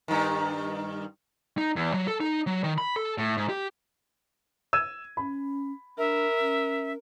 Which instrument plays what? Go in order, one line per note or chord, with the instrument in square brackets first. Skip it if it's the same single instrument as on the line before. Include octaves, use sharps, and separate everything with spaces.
[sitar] G2 D#3
[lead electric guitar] D#4
E2
F#3
A4
D#4
F#3
D#3
B5
A4
A2
G#2
G4
[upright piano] E6 G#6 D#7
[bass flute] C#4 [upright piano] B5
[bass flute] D4 [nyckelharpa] A#4 [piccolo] E5
[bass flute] C#4